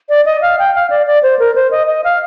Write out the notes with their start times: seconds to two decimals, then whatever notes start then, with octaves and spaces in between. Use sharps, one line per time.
0.09 D5
0.25 D#5
0.42 F5
0.59 G5
0.75 F5
0.90 D5
1.07 D5
1.23 C5
1.39 A#4
1.55 C5
1.71 D#5
1.87 D#5
2.04 F5